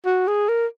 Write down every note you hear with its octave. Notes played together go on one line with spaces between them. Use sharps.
F#4
G#4
A#4